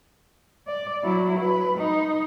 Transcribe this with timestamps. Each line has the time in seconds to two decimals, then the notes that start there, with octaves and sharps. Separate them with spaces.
0.67 D5
1.04 F#3 E4
1.40 B4
1.78 D#4